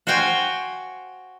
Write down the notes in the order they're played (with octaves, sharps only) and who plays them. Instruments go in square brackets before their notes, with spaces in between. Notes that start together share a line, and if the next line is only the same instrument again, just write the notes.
[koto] F#4 C5 F5 G5 G#5